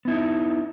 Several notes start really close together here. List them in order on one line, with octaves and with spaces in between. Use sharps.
B3 E4 D#4